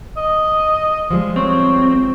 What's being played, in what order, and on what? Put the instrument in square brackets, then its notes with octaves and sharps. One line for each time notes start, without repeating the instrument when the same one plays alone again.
[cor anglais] D#5
[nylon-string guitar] F3 G3 G#3
[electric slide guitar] C4 [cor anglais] C#5